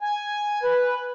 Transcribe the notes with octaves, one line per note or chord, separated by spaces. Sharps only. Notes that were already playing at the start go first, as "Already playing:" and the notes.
G#5
B4